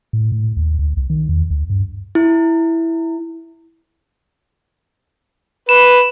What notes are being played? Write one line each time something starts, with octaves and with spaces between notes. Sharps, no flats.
A2
A2
D#2
D2
C2
D#3
E2
D2
G2
E4
B4 E7